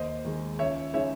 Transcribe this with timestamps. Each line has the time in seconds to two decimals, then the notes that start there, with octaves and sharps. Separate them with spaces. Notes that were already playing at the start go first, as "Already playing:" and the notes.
Already playing: D#2 C5 D#5
0.25 D#3 G#3
0.59 C#2 C#5 E5
0.94 C#3 G#3 D#4 C#5 E5